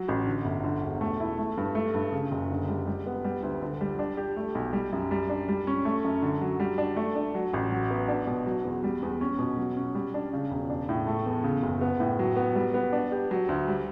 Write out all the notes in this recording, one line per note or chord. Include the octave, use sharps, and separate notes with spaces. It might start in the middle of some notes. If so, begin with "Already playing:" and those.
Already playing: F#3
A1
D3
G1
D3
E1
A3
E4
A3
G2
A3
G2
C#3
F#1
D3
G3
G3
B3
G3
D2
D3
G3
D4
G4
A3
B1
G3
F#2
G3
D4
G3
C#4
A3
F#2
D3
F#3
G3
D4
A3
D4
F#3
A1
F#3
B3
D4
B2
F#3
E2
G3
E2
C#4
B2
F#3
C#4
G3
D4
C#3
E1
D4
A2
A3
E2
C#3
F#1
B3
A2
F#3
B3
G3
B3
D4
G4
F#3
D2
G3